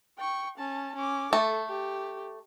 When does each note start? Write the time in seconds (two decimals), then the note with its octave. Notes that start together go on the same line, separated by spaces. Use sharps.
0.19 G5 C#6
0.58 C#4 A5
0.96 C#4 D6
1.33 A3 A4
1.68 G4